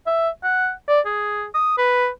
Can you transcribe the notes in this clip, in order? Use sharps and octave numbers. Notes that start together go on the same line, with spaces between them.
E5
F#5
D5
G#4
D#6
B4